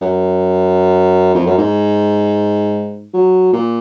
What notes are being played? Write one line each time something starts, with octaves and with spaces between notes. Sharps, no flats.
F#2
F2
F#2
G#2
F#3
A#2